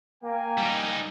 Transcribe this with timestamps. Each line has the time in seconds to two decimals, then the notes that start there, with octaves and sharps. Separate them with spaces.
0.23 A#3 G5 G#5
0.58 G3 D#4